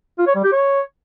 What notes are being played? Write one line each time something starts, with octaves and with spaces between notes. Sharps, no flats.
F4
C#5
G3
G4
C#5